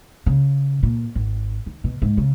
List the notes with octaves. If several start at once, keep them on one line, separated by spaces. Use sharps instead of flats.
C#3
A#2
G#1
D#3
B2
G#2
C#3